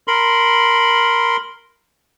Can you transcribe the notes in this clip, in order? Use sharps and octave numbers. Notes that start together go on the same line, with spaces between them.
A#4 B5 C6